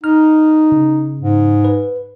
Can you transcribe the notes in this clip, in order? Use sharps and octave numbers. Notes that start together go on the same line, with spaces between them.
D#4 F6
C#3
G#2
B4